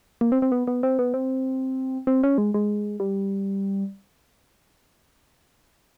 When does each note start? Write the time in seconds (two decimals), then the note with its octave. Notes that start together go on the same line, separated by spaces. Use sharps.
0.21 A#3
0.32 C4
0.42 C4
0.52 B3
0.67 B3
0.83 C4
0.99 B3
1.14 C4
2.07 C4
2.23 C#4
2.38 G#3
2.54 G#3
3.00 G3